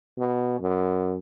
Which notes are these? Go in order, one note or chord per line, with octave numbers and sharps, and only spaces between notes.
B2
F#2